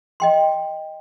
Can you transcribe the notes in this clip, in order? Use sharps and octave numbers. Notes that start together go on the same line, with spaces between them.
D#5 G5 C6